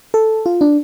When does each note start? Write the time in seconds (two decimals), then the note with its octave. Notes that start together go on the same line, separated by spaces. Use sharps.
0.14 A4
0.46 F4
0.61 D4